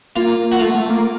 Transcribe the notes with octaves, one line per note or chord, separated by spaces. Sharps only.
A#3 F4
F#4
A3 F4
A3
A#3